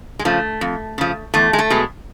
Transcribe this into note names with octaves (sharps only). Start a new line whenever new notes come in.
G#3
C#3 F3 A3
F2
C#3 F3
E2 A3
G#3
A3
B2 G#3